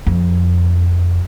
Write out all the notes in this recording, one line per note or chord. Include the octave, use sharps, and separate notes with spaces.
F2